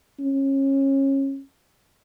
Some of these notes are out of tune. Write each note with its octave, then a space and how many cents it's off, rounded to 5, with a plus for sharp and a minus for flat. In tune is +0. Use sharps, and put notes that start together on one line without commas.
C#4 -25